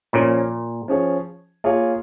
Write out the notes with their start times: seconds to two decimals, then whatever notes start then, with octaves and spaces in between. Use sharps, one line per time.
0.13 A#2 F3 C#4 A#4 C#5
0.88 F3 C#4 G#4 C#5
1.64 A#3 F4 G#4 C#5